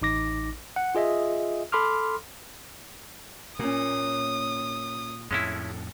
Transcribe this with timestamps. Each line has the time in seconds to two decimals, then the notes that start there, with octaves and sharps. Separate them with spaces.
0.02 A1 D#4 D6 A#6
0.76 F#5
0.95 F4 G#4 D#5 E5
1.72 A4 B5 C6 D6 F6
3.59 A#2 A#3 C#4 D#6
5.31 F2 A2 G#3 C#4 E4